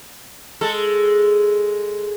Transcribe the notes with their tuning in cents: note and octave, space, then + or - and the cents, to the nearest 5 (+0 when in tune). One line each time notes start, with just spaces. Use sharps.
G#3 +0 A4 +0